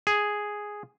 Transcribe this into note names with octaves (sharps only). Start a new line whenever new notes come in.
G#4